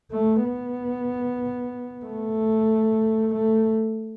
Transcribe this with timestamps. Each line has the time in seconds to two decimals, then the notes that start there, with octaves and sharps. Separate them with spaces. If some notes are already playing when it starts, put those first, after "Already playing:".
0.12 A3
0.44 B3
2.05 A3
3.35 A3